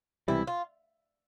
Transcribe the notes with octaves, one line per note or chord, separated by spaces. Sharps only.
C#2 C3 E3 G3 E4
F4